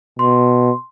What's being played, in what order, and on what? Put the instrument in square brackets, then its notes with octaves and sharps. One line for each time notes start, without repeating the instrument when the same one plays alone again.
[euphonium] B2 [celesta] C6